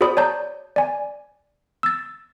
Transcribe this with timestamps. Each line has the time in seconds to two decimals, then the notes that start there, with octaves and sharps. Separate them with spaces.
0.01 F#4 G#4 C5 D5 B5 D#6
0.17 C#5 D5 A5 A#5 G6
0.76 D5 G#5
1.83 E6 A6